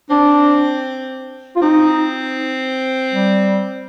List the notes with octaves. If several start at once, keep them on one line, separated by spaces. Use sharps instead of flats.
C4 D4
F4
C4 D#4
G3